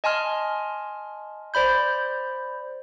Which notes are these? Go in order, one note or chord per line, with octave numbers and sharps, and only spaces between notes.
D#5 G#5 A5 C6 F6
C5 D5 B5 G6